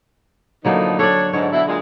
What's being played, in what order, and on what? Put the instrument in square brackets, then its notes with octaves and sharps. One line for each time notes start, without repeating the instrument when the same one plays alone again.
[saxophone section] A2 F3 D#4 [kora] D3 F#3 A#3
[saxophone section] D4 C#5 [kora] A4 D5
[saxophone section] G#2 [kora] D3 C#5
[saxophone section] B2 E4
A#2 G#3